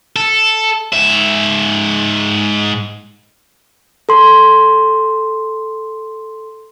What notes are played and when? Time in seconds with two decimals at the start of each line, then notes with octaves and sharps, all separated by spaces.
0.16 A4
0.93 G#2 E5
4.09 A4 C6